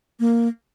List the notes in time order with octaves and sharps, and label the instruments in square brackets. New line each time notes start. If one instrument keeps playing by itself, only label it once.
[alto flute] A#3